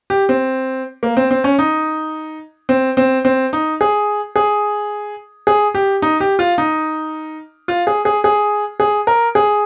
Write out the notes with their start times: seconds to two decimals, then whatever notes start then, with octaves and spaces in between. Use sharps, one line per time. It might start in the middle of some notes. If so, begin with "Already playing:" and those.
0.10 G4
0.29 C4
1.03 A#3
1.17 C4
1.31 C4
1.44 C#4
1.59 D#4
2.69 C4
2.97 C4
3.25 C4
3.53 D#4
3.81 G#4
4.36 G#4
5.47 G#4
5.75 G4
6.02 D#4
6.20 G4
6.39 F4
6.58 D#4
7.68 F4
7.87 G#4
8.05 G#4
8.24 G#4
8.80 G#4
9.07 A#4
9.35 G#4